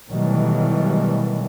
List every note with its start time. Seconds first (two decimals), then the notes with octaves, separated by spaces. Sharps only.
0.11 B2 D#3 E3 F#3 G3 A3